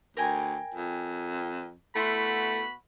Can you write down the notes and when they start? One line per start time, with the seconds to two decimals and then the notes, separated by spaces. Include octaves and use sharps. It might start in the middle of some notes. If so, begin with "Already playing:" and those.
0.17 D2 A#4 G5 G#5
0.74 F2
1.96 A3 B3 E4 F#4 F#5 B5 C6